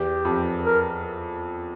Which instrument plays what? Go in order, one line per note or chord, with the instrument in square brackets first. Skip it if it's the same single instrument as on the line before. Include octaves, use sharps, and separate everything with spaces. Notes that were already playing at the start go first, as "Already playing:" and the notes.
Already playing: [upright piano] E2 [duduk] G4
[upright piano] F2
[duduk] A#4